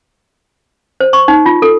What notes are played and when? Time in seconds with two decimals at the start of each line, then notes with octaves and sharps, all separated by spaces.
1.00 C5
1.13 C#6
1.28 D#4
1.46 F4
1.62 A4